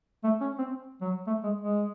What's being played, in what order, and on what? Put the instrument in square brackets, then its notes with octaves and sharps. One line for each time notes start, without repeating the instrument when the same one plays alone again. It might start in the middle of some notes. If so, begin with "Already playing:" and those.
[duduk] A3
C#4
C4
F#3
A3
G#3
G#3